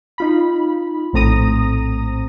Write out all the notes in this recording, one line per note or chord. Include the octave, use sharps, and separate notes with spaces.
D#4 F4 B5
A#1 A2 C4 A#5 D#6 A#6